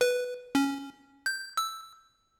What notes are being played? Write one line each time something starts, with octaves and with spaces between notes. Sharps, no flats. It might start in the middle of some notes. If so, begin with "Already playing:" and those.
B4
C#4
G6
E6